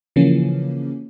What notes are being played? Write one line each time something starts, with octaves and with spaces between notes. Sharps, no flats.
C#3 E3 F3 A#3 C#4